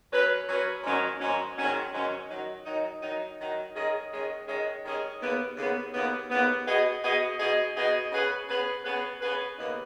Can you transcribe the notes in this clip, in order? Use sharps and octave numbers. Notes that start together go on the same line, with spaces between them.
F#3 C#4 B4
F#3 C#4 B4
G#2 D#3 F#3 C#4
G#2 D#3 F#3 C#4
G#2 D#3 F#3 C#4
G#2 D#3 F#3 C#4
D#3 F#3 D#4
D#3 F#3 D#4
D#3 F#3 D#4
D#3 F#3 D#4
D#3 G#3 C#4 G#4 D#5
D#3 G#3 C#4 G#4 D#5
D#3 G#3 C#4 G#4 D#5
D#3 G#3 C#4 G#4 D#5
D#2 C#3 B3
D#2 C#3 B3
D#2 C#3 B3
D#2 C#3 B3
B2 B3 G#4 D#5
B2 B3 G#4 D#5
B2 B3 G#4 D#5
B2 B3 G#4 D#5
C#3 B3 G#4 B4
C#3 B3 G#4 B4
C#3 B3 G#4 B4
C#3 B3 G#4 B4
D#2 C#3 B3 D#4 B4